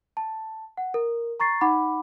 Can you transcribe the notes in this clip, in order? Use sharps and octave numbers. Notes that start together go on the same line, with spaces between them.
A5
F#5
A#4
A#5 C#6 A6 C7
D#4 F#5 B5 D6